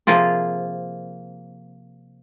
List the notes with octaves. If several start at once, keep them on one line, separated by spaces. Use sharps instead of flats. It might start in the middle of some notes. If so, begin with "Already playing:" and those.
C3 F3 A#3 F4 G#4